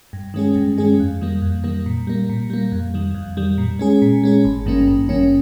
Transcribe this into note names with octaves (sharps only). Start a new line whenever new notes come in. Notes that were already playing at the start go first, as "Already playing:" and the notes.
G2
D#3 G#3 C#4 G#4
G2
D#3 G#3 C#4 G#4
F2
D#3 G3 A#3
F2
D#3 G3 A#3
A#2
G3 A#3
A#2
G3 A#3
F2
D#3 G3
F2
D#3 G3
A#2
G#3 C#4 G#4
A#2
G#3 C#4 G#4
G#1
G2 D#3 A#3 C#4
G#1
G2 D#3 A#3 C#4